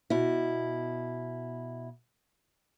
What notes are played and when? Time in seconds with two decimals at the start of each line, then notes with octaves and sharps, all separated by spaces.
0.10 B2 E4